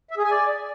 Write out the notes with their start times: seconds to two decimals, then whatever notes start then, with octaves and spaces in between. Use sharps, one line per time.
0.11 E5
0.18 G#4
0.24 G#5
0.31 D5